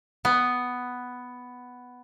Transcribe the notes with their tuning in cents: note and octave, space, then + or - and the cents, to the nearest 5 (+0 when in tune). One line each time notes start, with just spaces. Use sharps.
B3 +5